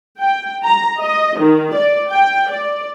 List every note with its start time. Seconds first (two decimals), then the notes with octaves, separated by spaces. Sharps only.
0.19 G5
0.63 A#5
0.98 D#5
1.38 D#3
1.73 D5
2.11 G5
2.50 D5